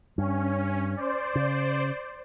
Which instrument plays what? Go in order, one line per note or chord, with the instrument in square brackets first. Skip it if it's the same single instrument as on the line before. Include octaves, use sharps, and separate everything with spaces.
[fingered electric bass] G2 [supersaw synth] C#4
[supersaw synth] C5 D5
[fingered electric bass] C#3